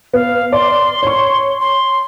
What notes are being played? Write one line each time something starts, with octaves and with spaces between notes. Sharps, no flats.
B3 F5
D5 C6
C#5 C#6
C6